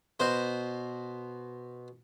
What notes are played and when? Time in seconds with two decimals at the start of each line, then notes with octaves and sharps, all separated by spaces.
0.20 B2 C5